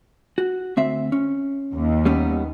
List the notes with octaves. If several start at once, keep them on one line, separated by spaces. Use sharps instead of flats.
F#4
D2 C4 E5
C#4
D#2
G3 B3 C#4